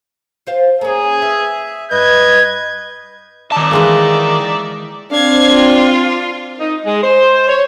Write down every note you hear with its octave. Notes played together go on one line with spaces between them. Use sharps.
F4 C5 F5
A#3 C#4 G#4
B4 E5
G2 B4 D#5 G6 G#6
D#3 D#4 D5 E5 A5
E3 G#3 A#3
C4 D4 F5 G#6
F4
D#4
G#3
C5
C#5